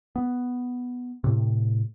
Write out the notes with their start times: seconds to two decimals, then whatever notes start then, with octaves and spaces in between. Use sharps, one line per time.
0.16 B3
1.24 A2 C3